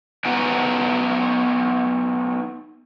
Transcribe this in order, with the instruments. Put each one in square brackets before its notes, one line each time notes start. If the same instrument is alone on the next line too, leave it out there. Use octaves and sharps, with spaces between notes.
[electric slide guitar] A3 B3 D#4 F#4 B4 G#5